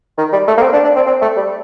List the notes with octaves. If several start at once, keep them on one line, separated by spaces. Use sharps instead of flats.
D#3
G3
A3
A#3
C4
D4
D4
C4
C4
A3
G3